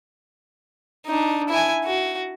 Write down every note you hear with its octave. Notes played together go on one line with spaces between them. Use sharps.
D4 D#4
E4 G#5
F#4